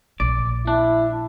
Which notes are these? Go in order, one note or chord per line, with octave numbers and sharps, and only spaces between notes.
A#1 D5
D4 E4